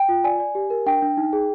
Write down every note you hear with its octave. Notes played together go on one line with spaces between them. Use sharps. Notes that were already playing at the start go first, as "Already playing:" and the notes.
Already playing: G5
F4
D5 G#5
D5
G4
A#4
D4 G5
D4
D#4
G#4